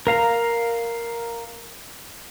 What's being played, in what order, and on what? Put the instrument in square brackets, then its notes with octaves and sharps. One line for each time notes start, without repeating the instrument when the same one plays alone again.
[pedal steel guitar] A#4 F5 A#5